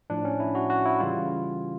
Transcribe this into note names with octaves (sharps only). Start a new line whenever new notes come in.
A2 F3 D4
C#4
E4
F#4
F#4
E4
C#3 E3 G3 F4